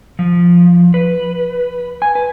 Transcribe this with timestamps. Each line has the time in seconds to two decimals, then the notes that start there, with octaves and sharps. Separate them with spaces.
0.19 F3
0.94 B4
2.02 G#5
2.15 B4